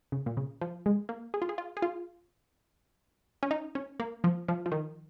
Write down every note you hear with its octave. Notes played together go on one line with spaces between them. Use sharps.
C#3
A#2
C#3
F3
G#3
A#3
G#4
F4
G#4
F4
G#4
F4
C#4
D#4
C#4
A#3
F3
F3
F3
D#3